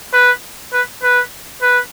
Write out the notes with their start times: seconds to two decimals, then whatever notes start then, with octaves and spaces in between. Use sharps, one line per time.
0.13 B4
0.73 B4
1.03 B4
1.62 B4